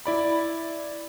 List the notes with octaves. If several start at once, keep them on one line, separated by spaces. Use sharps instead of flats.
E4 D5 B5